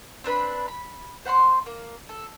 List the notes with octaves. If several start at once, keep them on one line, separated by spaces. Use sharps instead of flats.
C4 D4 B4 B5
B5
C5 F#5 B5 C6
A#3
A4